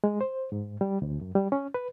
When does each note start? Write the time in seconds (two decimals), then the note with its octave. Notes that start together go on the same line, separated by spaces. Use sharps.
0.04 G#3
0.21 C5
0.52 G#2
0.81 G3
1.02 D2
1.21 F#2
1.35 G3
1.52 C#4
1.74 B4